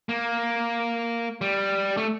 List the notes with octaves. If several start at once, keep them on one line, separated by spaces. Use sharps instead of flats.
A#3
G3
A3